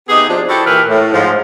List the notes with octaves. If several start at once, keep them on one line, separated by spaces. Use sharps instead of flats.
C3 B3 D#4 G4 G#4
F3 D4
E4 F#4 G4 A4
A#2 E3 G4 A#4 B4 E5
A2
G#2 F3